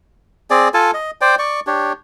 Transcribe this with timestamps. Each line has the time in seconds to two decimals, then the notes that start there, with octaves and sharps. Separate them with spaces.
0.50 C4 G#4 D5
0.74 F4 A4 G#5 A5
0.94 D#5
1.21 C5 D5 G5
1.39 D5 C#6
1.67 D4 G4 C#5